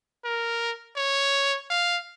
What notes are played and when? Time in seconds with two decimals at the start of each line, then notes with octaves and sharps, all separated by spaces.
0.25 A#4
0.96 C#5
1.70 F5